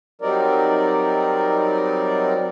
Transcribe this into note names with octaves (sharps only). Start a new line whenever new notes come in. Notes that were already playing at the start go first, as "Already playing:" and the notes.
F#3 G3 C4 D#4 A#4 D5